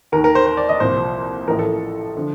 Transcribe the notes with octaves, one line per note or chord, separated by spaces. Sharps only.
D#2 D#3 A#4
A#4
C5
C5
D5
D#5
C2 A#2 F3 C5
A1 A2 F3 A#4
A4
D3 F3